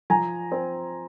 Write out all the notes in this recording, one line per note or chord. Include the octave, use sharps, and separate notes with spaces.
F3 G#5 A#5
C4